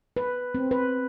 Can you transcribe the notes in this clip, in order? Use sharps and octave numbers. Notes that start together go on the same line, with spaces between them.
B4
C4
B4